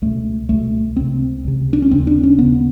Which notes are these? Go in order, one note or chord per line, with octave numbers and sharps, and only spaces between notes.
C#2 B2 A3
C#2 B2 A3
C#2 C3 C4
C#2 C3
D4
C#4
D#2 C#3 C4
D4
C#4
D#2 C#3 B3